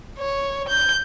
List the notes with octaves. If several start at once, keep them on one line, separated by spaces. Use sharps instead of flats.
C#5
G6